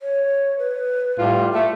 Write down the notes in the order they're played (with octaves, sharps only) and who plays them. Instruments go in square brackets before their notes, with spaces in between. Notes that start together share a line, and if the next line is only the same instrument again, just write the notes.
[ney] C#5
B4
[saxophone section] A2 G3 F4
[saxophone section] A3 [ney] E5